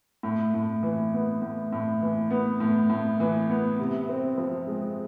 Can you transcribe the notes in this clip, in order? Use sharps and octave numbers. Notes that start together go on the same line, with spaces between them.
A2
A2
E3
B3
A2
A2
E3
B3
A2
A2
E3
B3
C3
C4
F3
G#3